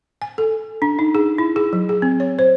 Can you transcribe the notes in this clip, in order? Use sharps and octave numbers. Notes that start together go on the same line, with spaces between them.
G#5
A4
D4
D#4
G#4
E4
G#4
F#3
G#4
C4
C#5
C5